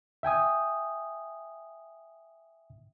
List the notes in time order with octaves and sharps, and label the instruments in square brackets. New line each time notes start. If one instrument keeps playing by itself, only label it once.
[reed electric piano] E5 G5 G#5 D#6